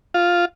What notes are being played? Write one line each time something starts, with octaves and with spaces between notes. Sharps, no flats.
F4